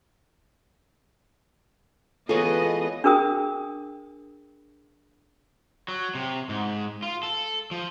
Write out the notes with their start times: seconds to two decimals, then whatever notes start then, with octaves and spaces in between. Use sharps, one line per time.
2.29 E3 B3 F4 G#4 A4 C#5 D#5
3.04 D4 G#4 A#4 G5 D#6
5.88 F#3
6.15 C3
6.49 G#2
7.03 F4
7.23 A4
7.71 F3